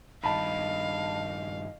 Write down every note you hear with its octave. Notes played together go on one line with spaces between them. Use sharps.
G2 D#3 D#5 F5 A5 B5